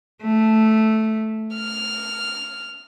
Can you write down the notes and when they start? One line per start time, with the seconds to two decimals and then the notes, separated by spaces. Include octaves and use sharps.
0.23 A3
1.55 F6